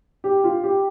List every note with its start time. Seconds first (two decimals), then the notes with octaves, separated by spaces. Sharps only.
0.24 G4
0.44 F4
0.64 G4